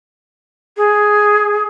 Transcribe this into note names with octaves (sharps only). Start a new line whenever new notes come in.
G#4